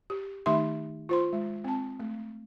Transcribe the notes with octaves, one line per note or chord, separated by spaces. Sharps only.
G4
D#3 A3 D#4 G4 E5 C6
F4 C5 C6
G#3
C4 A5
A3